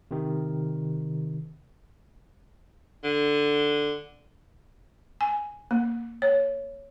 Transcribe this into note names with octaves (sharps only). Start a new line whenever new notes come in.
C3 D#3
D3
G#5
A#3
C#5